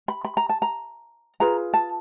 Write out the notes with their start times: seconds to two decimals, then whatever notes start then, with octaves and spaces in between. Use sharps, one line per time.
0.08 B5
0.25 B5
0.37 A#5
0.49 A5
0.62 A#5
1.40 F4 G#4 B4 A#5
1.74 A5